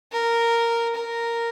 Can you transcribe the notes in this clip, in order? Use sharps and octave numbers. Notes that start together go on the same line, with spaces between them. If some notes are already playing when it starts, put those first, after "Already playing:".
A#4
A#4